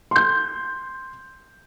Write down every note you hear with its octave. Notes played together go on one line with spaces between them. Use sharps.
C6 G6